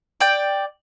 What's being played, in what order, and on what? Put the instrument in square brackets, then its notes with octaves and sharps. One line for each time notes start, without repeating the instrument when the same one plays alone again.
[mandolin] D5 G5